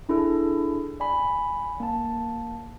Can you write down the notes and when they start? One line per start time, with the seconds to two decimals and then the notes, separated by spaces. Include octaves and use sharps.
0.09 D4 E4 G#4 A4
1.00 D5 G#5 B5
1.80 A#3 A5